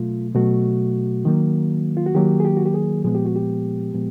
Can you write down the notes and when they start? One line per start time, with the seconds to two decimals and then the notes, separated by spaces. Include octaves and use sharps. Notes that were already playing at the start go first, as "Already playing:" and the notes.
Already playing: B2 F#3 A3 F4
0.35 B2 F#3 A3 F#4
1.25 D#3 F#3 A#3
1.97 F4
2.06 F#4
2.15 D#3 F#3 A#3 G4
2.40 G#4
2.45 G4
2.57 F#4
2.65 G4
2.74 G#4
3.04 A#2 F3 G#3 B3 G#4
3.15 G4
3.25 F#4
3.36 G4
3.94 A#2 F3 G#3 B3